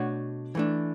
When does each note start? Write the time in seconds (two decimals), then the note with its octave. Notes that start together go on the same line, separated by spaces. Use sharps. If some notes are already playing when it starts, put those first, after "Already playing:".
Already playing: B2 A3 D4 F#4 C#5
0.55 E3 A3 D4